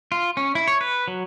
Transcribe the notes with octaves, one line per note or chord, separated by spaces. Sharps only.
F4
C#4
E4
C#5
B4
F#3